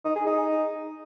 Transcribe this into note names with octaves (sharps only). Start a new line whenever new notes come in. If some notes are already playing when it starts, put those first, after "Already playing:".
D#4
G#4
D#4